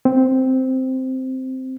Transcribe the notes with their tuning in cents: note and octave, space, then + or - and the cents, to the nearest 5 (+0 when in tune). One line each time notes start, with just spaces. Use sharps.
C4 -5